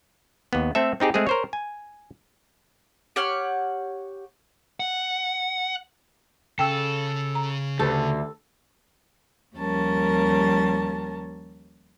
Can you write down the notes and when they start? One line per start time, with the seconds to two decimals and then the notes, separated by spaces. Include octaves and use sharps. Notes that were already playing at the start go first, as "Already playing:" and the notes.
0.53 D#2 B3
0.75 A3 C4 A4 E5
1.00 C4 D#4 G4 G#4
1.14 G#3 A3 C4 G#4
1.27 A#4 C5 C#5
1.53 G#5
3.16 G4 C#5 F#5 F6
4.80 F#5
6.59 C#3 A4 G5 E6
7.35 A#5
7.79 D2 G4 A4 B4
9.57 D#2 F3 G3 C#4 A#4 A5